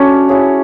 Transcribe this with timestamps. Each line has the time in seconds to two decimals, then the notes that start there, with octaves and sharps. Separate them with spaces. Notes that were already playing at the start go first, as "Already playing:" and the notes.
Already playing: A3 C#4 D4 F#4
0.29 E4 G#4 C#5